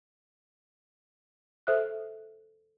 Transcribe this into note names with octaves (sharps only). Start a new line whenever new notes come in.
A4 C5 E5 D#6 F6 F#6